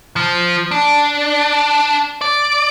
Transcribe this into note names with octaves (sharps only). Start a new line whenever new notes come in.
F3
D4
D5